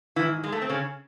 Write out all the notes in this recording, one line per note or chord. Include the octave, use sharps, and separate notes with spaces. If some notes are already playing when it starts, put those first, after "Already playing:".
G#2 D#3 E3 E4
G#3
A3
C4
C#3 C#4